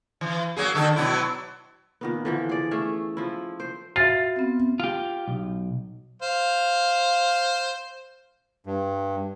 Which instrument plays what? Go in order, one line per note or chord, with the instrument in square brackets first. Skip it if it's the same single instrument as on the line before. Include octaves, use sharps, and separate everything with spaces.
[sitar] E3
F#3 A#3 G#4
D3 D#3 A4
B2 F#3 E4
[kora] A#2 D#3 B3
D3 E3 F3
G#4 D5
A3 C#4 G#4 E5
F3 E4
C5
[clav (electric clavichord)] F4 [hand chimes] F#4 E5 [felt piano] A6
[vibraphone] B3 C4
[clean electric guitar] F4 G4
B1
[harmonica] C5 F5
[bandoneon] G2